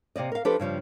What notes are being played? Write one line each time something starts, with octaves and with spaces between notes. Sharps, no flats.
C3 A#3 D5 D#5
A#4 F5
F3 D4 G4 A4 B4 C5
G2 C#3 F3 G3